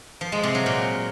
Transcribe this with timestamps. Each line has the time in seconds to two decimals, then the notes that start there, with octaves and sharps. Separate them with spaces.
0.21 F3
0.32 G#3
0.43 C3
0.55 F#3
0.66 A#2